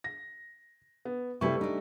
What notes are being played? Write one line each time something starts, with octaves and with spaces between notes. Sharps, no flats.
A#6
B3
C3 G3 A3 E4 B4 C#6
D4 D#4